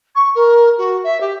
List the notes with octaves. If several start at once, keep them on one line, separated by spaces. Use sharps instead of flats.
C#6
A#4
F#4
E5
G4